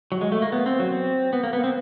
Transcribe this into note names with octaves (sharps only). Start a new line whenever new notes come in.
F#3
G#3
A3
A#3
B3
C4
F#3
C4
B3
A#3
B3
C4